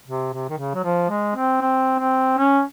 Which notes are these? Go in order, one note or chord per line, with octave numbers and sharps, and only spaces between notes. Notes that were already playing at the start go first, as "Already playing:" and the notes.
C3
C3
D#3
C#3
F#3
F3
G#3
C4
C4
C4
C#4